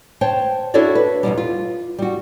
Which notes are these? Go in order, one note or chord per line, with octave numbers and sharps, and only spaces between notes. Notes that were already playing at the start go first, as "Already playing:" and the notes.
C5 C#5 G5 A5
D4 E4 F#4 A4 C#5 D5
B4
F2 G#2 B2 G3
F4
G3 F#4